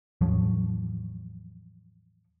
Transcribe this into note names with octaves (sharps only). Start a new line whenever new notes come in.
E2 A2 F3 F#3